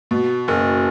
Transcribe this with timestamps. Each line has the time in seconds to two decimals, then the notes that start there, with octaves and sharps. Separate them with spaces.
0.11 B2
0.48 F#1